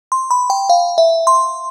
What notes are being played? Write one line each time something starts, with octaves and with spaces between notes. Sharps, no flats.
C6
B5
G5
F5
E5
C6